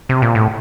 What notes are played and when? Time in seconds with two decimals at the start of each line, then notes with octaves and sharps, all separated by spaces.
0.09 C3
0.22 A#2
0.35 A2